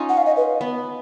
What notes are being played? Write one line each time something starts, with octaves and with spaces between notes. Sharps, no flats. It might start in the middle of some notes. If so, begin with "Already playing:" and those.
Already playing: C#4 D#4 F4
F#5
F5
D#5
B4
B3